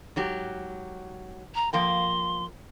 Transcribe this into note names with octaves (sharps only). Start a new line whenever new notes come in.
G#2 F#3 G4
A#5
F3 A#3 G5 C6